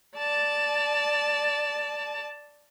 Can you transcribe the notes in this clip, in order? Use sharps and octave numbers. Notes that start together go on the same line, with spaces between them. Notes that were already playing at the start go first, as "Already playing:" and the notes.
D5 A5